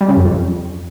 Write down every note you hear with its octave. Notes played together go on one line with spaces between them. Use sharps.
G3
C#3
F#2
F2